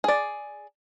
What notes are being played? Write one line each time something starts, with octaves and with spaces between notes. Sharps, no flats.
G#4 D5